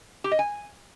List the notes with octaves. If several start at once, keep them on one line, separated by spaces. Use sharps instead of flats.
G4
D#5
G#5